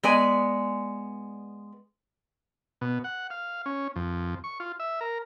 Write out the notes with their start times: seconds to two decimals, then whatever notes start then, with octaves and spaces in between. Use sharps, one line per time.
0.03 G#3 B3 D5 G#5
2.81 B2
3.04 F#5
3.30 F5
3.66 C#4
3.96 F2
4.44 C#6
4.60 F4
4.80 E5
5.01 A#4